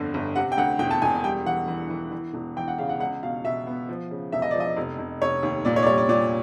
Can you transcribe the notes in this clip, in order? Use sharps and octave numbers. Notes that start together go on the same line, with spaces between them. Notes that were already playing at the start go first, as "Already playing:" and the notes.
Already playing: G1 F2 D3
G1
C3 F#5
G5
D2 F#5
E1 G5
A5
E1 G#5
G3 G5
E3 F#5
E3
E3
E3
E1
E3 G5
F#5
C#3 F5
F#5
C#2 F#5
B2 F5
B2 E5
B3
F3
C#3
E1 E5
D#5
F3 D5
D#5
F1
F1
F1 C#5
D#2
A#2 D5
C#5
D5
G3 C#5
D5
A#2 D5